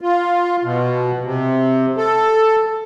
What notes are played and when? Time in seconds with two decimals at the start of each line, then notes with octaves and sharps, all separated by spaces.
0.01 F4
0.64 B2
1.24 C3
1.97 A4